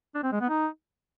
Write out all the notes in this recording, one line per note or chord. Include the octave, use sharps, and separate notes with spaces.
D4
C4
G#3
B3
D#4